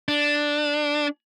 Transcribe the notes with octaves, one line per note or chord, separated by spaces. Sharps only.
D4